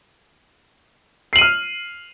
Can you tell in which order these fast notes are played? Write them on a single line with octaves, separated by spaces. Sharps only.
C7 F#7 D#7 F6